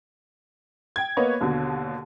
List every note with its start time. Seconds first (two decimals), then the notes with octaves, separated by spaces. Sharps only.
0.96 G5 G#6
1.17 A#3 B3 B4 C#5 D#5
1.41 D#2 B2 D3